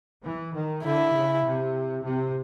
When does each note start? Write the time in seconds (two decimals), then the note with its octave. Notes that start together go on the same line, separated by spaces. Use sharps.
0.23 E3
0.53 D#3
0.84 D3 E4
1.13 C#3
1.44 C3
2.05 C3